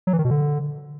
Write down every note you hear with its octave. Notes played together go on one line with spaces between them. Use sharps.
F#3
E3
D#3
B2
D3